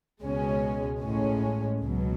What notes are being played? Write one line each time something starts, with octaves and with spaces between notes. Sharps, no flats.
C#2 B2 G#3 C#4
A1 A2 G#3 C#4
C#2 B2 F#3